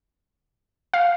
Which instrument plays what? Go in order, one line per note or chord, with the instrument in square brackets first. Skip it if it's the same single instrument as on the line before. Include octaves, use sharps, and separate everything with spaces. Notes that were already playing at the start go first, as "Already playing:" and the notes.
[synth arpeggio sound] F5